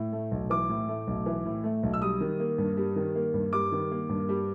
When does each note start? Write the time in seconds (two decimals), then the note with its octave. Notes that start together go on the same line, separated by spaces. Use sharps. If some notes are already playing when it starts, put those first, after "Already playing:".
Already playing: A2
0.12 A3
0.31 B1
0.50 E3 D6
0.69 A2
0.89 A3
1.07 B1
1.26 E3
1.45 A2
1.64 A3
1.83 B1
1.93 E6
2.02 G3 D#6
2.21 D#3
2.40 A#3
2.58 G2
2.77 G3
2.96 D#3
3.15 A#3
3.34 G2
3.53 G3 D6
3.72 D#3
3.91 A#3
4.09 G2
4.29 G3